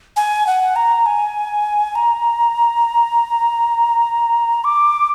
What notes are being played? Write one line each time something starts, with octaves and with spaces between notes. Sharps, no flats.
G#5
F#5
A#5
G#5
A#5
D6